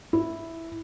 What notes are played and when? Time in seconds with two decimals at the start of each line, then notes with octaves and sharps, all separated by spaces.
0.13 E4